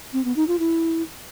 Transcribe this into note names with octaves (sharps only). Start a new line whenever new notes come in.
C4
B3
D#4
F4
E4